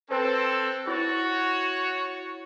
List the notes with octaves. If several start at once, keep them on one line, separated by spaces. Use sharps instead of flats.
C4 A4 B4 C5
E4 F#4 C#5 A6